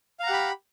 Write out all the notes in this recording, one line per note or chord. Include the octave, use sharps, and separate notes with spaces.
G4 F5 F#5 A#5 B5